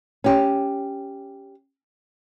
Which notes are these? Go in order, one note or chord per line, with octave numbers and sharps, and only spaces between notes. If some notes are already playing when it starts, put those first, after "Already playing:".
C#4 G4